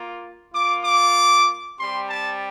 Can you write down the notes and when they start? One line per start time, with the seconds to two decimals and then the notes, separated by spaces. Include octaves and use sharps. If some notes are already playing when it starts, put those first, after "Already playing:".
Already playing: A#3 F4
0.54 A#3 F4 D6
0.84 D6
1.78 G3 C4 G4 C6
2.09 A5